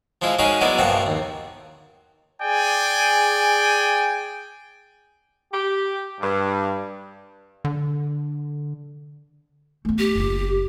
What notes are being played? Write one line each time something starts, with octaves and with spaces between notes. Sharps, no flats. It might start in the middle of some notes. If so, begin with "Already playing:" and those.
F3 G#3 E4 F4
G#3 C#4 D#4 F#4 G#4 A#4
F#3 G#3 B3 E4 D5
A#1 G2 C3 F3 F#4 F#5
D#2
G#4 D5 G5 G#5
G4
G2
D3
A3 B3
G4
F#1 F4